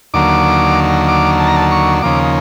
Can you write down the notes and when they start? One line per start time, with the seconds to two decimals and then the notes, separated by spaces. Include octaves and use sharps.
0.14 D#2 D3 F#3 A#3 D6
1.08 D6
1.40 A5
1.48 A#5
1.56 A5
1.72 C#6
2.02 D#2 C#3 F3 A#3 D6